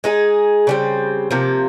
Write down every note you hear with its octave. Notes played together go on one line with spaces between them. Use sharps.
G#3 D#4 G#4
C#3 G3 C4
C3 F3 A#3